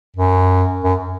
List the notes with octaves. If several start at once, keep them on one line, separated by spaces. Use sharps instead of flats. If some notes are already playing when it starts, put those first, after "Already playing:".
F#2
F#2